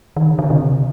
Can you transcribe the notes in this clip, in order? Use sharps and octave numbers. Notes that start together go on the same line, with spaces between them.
D#3
D3
D3
C3